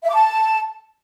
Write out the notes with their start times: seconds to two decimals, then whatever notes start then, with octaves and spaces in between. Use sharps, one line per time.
0.04 E5
0.09 D6
0.15 A5